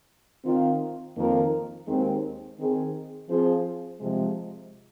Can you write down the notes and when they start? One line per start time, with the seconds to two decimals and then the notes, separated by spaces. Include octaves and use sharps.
0.44 D#3 C4 F4
1.16 F2 D#3 A#3 F4 A#4
1.87 D#2 D#3 G#3 C4
2.58 D#3 C4 G#4
3.29 F3 C4 F4 G#4 C5
4.00 C3 F3 G#3